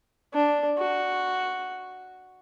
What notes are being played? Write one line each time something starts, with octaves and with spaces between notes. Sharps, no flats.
D4
F#4